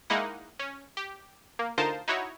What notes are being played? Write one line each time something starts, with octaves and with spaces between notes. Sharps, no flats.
G#3 A#3 D#4 E4 F#5
C#4
G4
A#3
D2 D#4 F4 A#4 C5 A5
D#4 E4 F#4 C#5